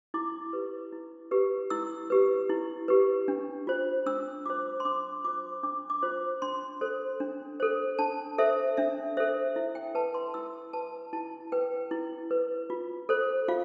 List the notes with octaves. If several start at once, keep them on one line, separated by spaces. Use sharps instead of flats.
E4 D6
G4 B4
E4
G4 B4
E4 E6
G4 B4
E4
G4 B4
D4
F4 C5
D4 E6
F4 C5 D6
C6
D4 D6
F4 C5 D6
D4 D6
D6
F4 C5
D4 C6
A4 C5
D4
A4 C5
D4 A5
A4 C5 E5
D4 E5
A4 C5 E5
E4 E5
G5
B4 A5
C6
E4 E6
B4 A5
E4 A5
B4 G5
E4
B4
F4
A4 C5
F4 F5